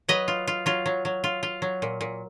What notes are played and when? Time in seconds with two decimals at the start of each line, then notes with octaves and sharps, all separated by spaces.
0.09 F#3 B4 D#5
0.28 F4
0.47 F4
0.66 F#3 F4
0.86 F#3
1.05 F#3
1.24 F4
1.43 F4
1.62 F#3
1.82 A#2
2.01 A#2